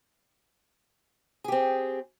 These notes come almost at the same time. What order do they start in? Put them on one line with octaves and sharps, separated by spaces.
G#4 G4 C4